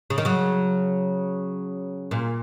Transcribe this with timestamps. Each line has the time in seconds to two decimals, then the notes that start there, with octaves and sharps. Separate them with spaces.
0.10 C#3
0.18 D#3
0.25 C#3 F#3
2.11 A#2